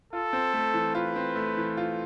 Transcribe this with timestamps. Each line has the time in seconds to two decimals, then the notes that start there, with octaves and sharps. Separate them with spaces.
0.13 F4 A4
0.33 C4
0.53 A3
0.74 E3
0.95 F4 B4
1.16 C4
1.36 A3
1.57 E3
1.77 F4